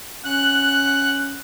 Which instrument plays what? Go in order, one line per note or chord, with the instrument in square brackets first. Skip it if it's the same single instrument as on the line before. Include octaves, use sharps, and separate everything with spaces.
[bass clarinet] C#4 [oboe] F#5 [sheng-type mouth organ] F#6